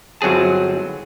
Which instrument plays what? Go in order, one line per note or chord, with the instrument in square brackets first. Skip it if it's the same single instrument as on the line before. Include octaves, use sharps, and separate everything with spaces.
[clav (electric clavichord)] G1 F#3 C4 G#4 A5